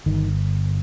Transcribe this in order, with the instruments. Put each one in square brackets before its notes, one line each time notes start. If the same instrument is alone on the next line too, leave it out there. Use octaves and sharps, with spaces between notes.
[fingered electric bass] G1 D#3